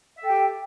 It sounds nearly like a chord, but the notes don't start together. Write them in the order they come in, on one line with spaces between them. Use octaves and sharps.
E5 A4 G5 G4